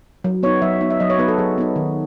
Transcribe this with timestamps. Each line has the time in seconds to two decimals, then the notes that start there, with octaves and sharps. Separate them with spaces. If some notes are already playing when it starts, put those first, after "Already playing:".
0.24 F#3
0.43 B3 D#4 C#5
0.62 F#3 E5
0.81 B3 D#4
0.90 E5
1.00 F#3 D#5
1.10 C#5
1.19 B3 D#4 B4
1.28 A4
1.38 F#3 G#4
1.58 B3 D#4
1.76 D#3